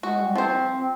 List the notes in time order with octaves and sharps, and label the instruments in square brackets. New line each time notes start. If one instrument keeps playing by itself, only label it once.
[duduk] G#3 [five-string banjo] F#4
[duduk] G3
[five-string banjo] F3 C5 [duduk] C4
[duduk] C4